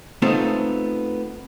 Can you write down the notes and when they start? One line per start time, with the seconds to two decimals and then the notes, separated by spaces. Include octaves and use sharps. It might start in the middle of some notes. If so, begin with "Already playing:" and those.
0.22 A3 B3 C4 D#4 F4 A4